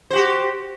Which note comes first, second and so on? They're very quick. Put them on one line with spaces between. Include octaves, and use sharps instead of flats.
C5 F#4 G4